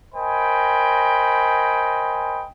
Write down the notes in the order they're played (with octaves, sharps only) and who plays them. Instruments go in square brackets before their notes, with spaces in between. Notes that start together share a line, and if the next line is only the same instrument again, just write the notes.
[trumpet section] A#4 C5 D#5 G5 G#5 B5